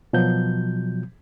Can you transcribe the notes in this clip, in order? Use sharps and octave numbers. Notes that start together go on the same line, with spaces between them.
B2 F3 F#3 G6